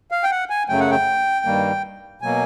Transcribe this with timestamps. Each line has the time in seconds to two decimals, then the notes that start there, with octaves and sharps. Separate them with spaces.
0.11 F5
0.24 G5
0.31 F#5
0.50 G#5
0.69 F#2 C#3 F#3 A3 G5
0.80 F#5
0.91 G5
1.45 G2 D#3 G3 A#3
2.22 B2 F#3 A#3 G#5